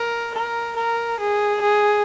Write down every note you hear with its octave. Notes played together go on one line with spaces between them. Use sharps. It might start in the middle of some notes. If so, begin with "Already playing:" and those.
Already playing: A#4
A#4
A#4
G#4
G#4